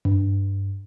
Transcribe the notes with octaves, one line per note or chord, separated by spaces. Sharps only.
G2